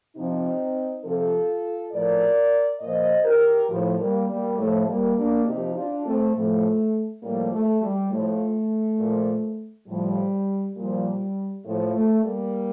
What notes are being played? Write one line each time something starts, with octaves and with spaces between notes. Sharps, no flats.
C3 F3 C4 D#4
C3 F3 F4 A4
A2 F3 A#4 D5
A#2 F3 C5 D#5
G4 A#4
A2 F3
G3 A#3
G3 A#3
A2 F3 A3
G3 A#3
A#3 D4
C3 F3 D#4 G4
D4 F4
A3 C4
A2 F3 A3
A2 F3 G3 A#3
A3
G3
A2 F3 A3
A#2 F3
A2 F3 G3
A#2 F3 G3
A2 F3 A3
A3
G3 A#3